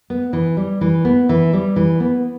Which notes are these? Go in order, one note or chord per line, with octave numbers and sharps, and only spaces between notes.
B3
E3
G3
E3
B3
E3
G3
E3
B3